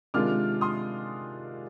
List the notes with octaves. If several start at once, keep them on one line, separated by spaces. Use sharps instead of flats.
C3 D#3 G#3 D4 F4 D6 F6
C6 D#6